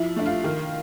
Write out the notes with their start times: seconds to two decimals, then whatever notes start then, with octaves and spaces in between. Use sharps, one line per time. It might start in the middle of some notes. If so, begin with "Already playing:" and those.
Already playing: F3 E4
0.16 A3 D4
0.26 F4
0.44 D#3